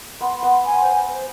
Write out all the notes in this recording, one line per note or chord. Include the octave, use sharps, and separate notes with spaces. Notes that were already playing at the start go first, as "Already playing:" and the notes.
B3 C6
C6
B3
C6
G#5
C5
C5
C5